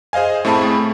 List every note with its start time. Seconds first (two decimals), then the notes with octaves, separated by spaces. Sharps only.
0.13 G#4 C5 D#5 F5 G#5
0.45 A2 A3 C4 G#4 A5 B5